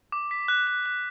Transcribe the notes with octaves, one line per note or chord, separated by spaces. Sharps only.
D6
B6
F#6
F#6
F#6